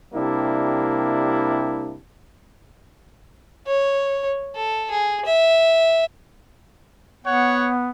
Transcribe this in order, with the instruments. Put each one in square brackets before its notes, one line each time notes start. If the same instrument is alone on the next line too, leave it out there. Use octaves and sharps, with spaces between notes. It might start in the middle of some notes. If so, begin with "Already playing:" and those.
[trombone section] C3 G3 A#3 D4 E4
[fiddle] C#5
A4
G#4
E5
[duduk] B3 [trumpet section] C#5 F#5